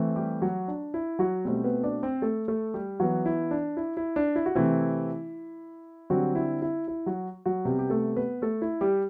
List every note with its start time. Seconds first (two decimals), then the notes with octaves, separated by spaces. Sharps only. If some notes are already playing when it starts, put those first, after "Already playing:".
Already playing: E3 A3 C4
0.16 G3 G4
0.42 F#3 F#4
0.68 D4
0.94 E4
1.19 F#3 F#4
1.45 B2 G3 A3 C4 G4
1.64 B3 B4
1.83 D4 D5
2.03 C4 C5
2.22 A3 A4
2.48 A3 A4
2.74 G3 G4
3.00 E3 F#3 B3 F#4
3.26 E4
3.51 D4
3.77 E4
3.97 E4
4.16 D4
4.36 E4
4.46 F#4
4.55 C3 E3 A3 C4 E4
6.10 D3 F#3 G3 C4 F#4
6.35 E4
6.62 E4
6.88 E4
7.06 F#3 F#4
7.45 F#3 F#4
7.65 C3 G3 B3 G4
7.79 G4
7.90 A3 A4
8.16 B3 B4
8.42 A3 A4
8.62 E4
8.81 G3 G4